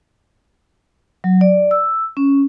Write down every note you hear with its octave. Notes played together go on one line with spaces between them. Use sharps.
F#3
D5
E6
C#4